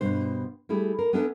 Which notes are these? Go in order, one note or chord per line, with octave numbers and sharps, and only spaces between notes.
G2 B2 C5
G3 A3 E4 G#4
A#4
B3 C#4 D4 A4 E5